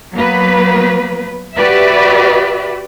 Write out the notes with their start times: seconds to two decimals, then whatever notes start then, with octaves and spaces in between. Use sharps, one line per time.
0.14 F#3 A#3 B3 B4
1.56 F#4 G4 B4 D5 E5